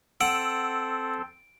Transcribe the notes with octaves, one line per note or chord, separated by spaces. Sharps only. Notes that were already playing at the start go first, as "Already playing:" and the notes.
C4 A4 F#5 E6 D7